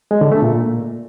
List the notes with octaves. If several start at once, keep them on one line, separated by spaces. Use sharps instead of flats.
G#3
D3
A3
A#2